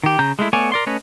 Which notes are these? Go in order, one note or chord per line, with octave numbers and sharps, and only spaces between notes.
D#3 G4
C#3 A#5 G6
G#3 A3 E4
A3 B3 C#5 D5 G#5
A#4 D5 C6
A3 C#4 B4 C#5 D#5